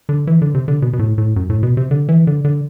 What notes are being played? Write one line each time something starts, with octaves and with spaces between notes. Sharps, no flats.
D3
E3
D3
C3
D3
B2
B2
A2
A2
F#2
A2
B2
C3
D3
E3
D3
D3